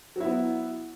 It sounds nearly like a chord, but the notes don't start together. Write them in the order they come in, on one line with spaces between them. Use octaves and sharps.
F#3 E4 B3